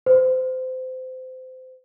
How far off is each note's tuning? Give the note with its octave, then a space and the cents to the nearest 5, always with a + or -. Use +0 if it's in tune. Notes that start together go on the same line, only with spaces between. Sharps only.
C5 -25